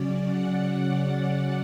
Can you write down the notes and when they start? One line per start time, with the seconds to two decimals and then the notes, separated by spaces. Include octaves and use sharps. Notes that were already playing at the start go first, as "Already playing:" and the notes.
Already playing: C#3 F#3 C#4 D5
0.25 F#5